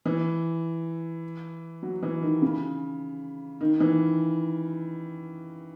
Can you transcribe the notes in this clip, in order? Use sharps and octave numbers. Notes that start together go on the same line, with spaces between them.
E3
F#3
E3
D#3
C#3
D#3
E3